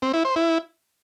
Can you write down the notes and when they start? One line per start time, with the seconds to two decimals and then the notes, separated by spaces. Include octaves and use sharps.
0.02 C4
0.14 E4
0.25 C5
0.36 E4